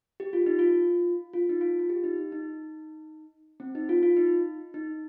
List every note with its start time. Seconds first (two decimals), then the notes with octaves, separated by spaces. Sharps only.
0.20 G4
0.33 F4
0.46 D#4
0.59 F4
1.33 F4
1.49 D#4
1.61 F4
1.79 F4
1.90 G4
2.04 D#4
2.18 D#4
2.32 D#4
3.60 C4
3.75 D#4
3.89 F4
4.03 F4
4.17 D#4
4.74 D#4